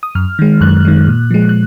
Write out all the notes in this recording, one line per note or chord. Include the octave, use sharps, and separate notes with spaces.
D#6
F#2 F6
D#3 G#3
F#2 F#6
D#3 G#3
A#2
F3 G#3
F#6